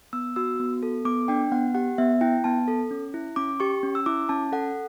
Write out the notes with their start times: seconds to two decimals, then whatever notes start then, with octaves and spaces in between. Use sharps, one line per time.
0.13 B3 E6
0.36 F#4 E6
0.60 B3
0.83 A4
1.05 B3 D6
1.28 D4 G5
1.52 B3 F#5
1.75 G4 F#5
1.98 B3 E5
2.21 E4 G5
2.44 B3 A5
2.68 A4
2.91 C#4
3.14 E4
3.36 C#4 D6
3.60 G4 C#6
3.83 C#4
3.95 E6
4.06 E4 D6
4.29 C#4 A5
4.52 A4 F#5